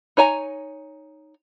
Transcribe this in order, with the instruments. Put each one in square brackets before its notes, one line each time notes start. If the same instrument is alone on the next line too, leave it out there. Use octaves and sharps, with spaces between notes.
[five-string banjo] D#4 C#5 G#5 A#5